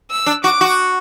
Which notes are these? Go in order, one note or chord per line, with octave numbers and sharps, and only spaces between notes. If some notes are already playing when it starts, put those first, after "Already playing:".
E6
D4
F#4 D6
F#4